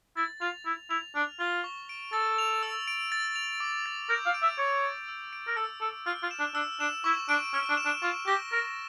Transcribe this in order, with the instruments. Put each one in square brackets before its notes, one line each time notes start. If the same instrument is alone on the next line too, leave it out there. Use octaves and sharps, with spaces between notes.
[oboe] E4 [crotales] A6
[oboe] F4 [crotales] F7
[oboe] E4 [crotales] A6
[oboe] E4 [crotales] F7
[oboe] D4 [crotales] F6
[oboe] F4 [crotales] G7
[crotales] C#6
D7
[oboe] A4 [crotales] A6
[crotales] F7
E6
D7
A6
F7
D6
A6
[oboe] A#4 [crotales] G6
[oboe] F5
[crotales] D7
[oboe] E5
[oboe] C#5 [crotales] D6
[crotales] A6
E6
D7
[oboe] A#4
[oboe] A4 [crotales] E6
[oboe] A4 [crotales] D7
[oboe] F4 [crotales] F6
[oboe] F4
[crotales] E7
[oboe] D4
[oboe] D4 [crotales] E6
[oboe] D4 [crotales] E7
[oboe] E4 [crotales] C#6
[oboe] D4 [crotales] D7
[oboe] C#4 [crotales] F6
[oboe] D4
[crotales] E7
[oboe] D4
[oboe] F4 [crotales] C#6
[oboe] G4 [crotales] A#6
[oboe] A#4 [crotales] A6